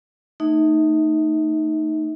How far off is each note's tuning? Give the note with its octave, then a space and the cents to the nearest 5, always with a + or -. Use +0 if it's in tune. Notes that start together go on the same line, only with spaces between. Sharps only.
A3 +25 D#4 -5 E5 -35